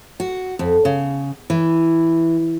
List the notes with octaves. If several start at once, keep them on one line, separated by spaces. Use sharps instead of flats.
F#4
F2
C#3
E3